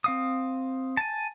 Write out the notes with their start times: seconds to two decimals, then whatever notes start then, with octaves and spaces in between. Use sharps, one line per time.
0.04 C4 F5 D#6
0.97 G#5 A5